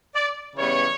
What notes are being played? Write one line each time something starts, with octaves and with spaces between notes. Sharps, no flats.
D5
C#3 E3 G3 B3 C#5